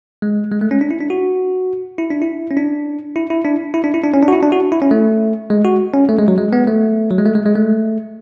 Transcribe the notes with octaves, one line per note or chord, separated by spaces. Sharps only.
G#3
G#3
A3
C#4
D4
E4
D4
F#4
E4
D4
E4
C#4
D4
E4
E4
D4
E4
D4
E4
D4
C#4
D4
F#4
E4
D4
F#4
E4
C#4
A3
G#3
F#4
C#4
A3
G#3
F#3
G#3
B3
A3
F#3
G#3
A3
G#3
G#3
A3